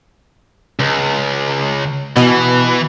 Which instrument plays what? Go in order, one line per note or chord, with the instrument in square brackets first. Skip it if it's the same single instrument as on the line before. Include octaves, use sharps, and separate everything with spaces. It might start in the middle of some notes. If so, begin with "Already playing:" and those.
[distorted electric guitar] C#2
[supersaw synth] B2 [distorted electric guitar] E3